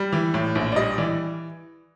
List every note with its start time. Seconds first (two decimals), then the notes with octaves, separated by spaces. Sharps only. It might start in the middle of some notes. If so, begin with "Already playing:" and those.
Already playing: G3
0.13 E3
0.34 A2
0.55 A#1
0.72 D5
0.76 G3 D#5
0.98 E3 D5